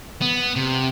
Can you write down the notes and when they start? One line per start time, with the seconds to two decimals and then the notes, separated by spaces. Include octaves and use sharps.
0.22 B3
0.56 C3